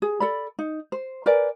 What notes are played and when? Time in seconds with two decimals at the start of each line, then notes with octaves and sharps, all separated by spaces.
0.02 G#4
0.20 A4 D5 B5
0.59 D#4
0.92 C5
1.26 A#4 B4 D5 G#5